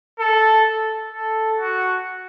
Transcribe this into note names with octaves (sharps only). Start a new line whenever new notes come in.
A4
A4
F#4